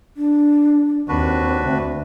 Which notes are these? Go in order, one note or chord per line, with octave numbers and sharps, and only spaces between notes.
D4
D#2 C4 D4 F#4 B4
D2